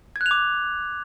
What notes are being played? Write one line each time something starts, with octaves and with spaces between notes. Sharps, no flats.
G#6
F#6
F7
D6